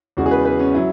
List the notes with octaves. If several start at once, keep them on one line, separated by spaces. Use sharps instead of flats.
E2 C#3 G#3 F#4
G#4
B4
B4
C#4
F#3 E4